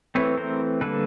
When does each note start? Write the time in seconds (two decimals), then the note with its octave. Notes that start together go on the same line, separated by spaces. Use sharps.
0.15 E3 A3 C4 B4 C#5
0.37 A#4 C5
0.81 D3 G3 A#3 A4 B4